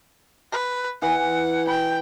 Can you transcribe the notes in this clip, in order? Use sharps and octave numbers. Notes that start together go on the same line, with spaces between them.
B4
E3 F#5
G5 B5